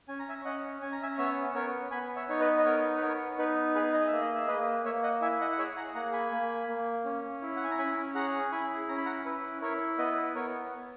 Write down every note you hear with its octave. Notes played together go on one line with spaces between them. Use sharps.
C#4 G#5
A#5
E5 G#5
C#4 D#5 F#5
C#4 G#5
A#5
E5 G#5
B3 C#5 E5
B3 A#4 C#5
B3 G#5 B5
C#5 E5
D#4 C#5
B4 D#5
D#5
B3 A#4 C#5
B4
B3 A#4 C#5
D#4 B4
G#4 B4
D#5
E5
A#3
D#5
E5
A#3 B4 D#5
A#3 C#5 E5
D#5 F#5
E4 E5 G#5
D#5 F#5
F#5
G#4 C#5 E5
F#5 A#5
A#3 F#5 A#5
G#5 B5
A#3
A#3
C#4
E4
F#5
G#5
A#5
C#4 G#5 B5
G#4 F#5 A#5
E4 G#5 B5
C#4 A#5
B5
F#5 A#5
E4 B4
E4 A#4 C#5
B3 B4 D#5
B3 A#4 C#5